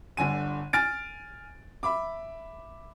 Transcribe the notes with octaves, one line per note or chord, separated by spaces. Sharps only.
G1 D3 G#5 D#7
G#5 F6 A6 D7
E5 B5 D6